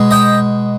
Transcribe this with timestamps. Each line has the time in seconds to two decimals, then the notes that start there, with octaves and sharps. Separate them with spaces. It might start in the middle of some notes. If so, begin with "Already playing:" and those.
Already playing: B2 G#3
0.11 D#5 G5